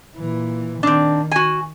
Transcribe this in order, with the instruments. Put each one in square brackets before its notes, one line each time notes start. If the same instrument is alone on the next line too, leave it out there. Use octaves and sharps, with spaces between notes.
[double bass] A#2 E3
[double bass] D#3 [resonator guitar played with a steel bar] C4 D4
[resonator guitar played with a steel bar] F#4 G#5